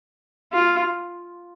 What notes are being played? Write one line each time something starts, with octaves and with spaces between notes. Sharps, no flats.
F4